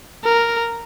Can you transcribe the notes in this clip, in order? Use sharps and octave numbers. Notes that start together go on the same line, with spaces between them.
A#4